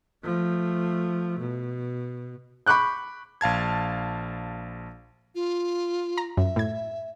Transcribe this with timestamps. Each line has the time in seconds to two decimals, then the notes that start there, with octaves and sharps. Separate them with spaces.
0.23 F3 A3
1.39 B2
2.66 B5 C#6 D6 F#6 G6
3.41 A#1 F5 A5 G#6
5.35 F4
6.18 A#5
6.37 F#2 E5
6.56 A2 G#6